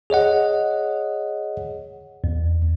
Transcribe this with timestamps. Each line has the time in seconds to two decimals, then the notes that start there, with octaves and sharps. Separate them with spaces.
0.10 G#4 C#5 D#5 F#5
2.24 E2